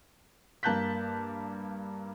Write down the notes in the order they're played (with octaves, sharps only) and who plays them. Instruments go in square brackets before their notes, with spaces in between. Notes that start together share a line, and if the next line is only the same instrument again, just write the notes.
[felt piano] G2 A#3 A5 F#6 G6 B6